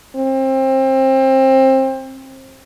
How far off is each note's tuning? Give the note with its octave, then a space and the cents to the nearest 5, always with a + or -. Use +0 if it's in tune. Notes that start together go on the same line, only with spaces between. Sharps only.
C4 +25